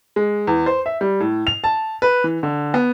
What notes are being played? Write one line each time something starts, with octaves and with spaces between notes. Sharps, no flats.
G#3
E2
C5
E5
G3
A2
F7
A5
B4
E3
D3
B3